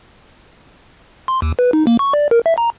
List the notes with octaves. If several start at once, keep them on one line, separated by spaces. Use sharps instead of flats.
C6
D#2
B4
D#4
A#3
C#6
D5
A#4
E5
A#5